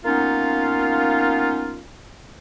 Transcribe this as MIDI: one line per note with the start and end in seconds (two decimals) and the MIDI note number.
0.05 1.81 58
0.05 1.81 59
0.05 1.81 61
0.05 1.81 63
0.05 1.81 65